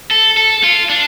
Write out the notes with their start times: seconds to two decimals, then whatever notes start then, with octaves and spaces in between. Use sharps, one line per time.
0.11 A4
0.37 A4
0.64 F4
0.90 D4